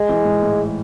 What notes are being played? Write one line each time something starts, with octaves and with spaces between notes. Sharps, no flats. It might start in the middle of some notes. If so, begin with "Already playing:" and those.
Already playing: G#3
E3
G#2
A2